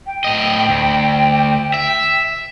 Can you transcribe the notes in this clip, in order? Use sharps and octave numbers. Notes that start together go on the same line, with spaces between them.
G5
A2 D#5
D2
E5